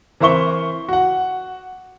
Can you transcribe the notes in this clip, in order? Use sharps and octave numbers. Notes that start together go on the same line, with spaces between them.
E3 A#4 C5 E5 C#6 G7
F#4 F#5